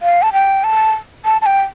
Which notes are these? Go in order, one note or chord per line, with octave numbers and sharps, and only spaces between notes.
F5
A5
G5
A5
A5
A5
G5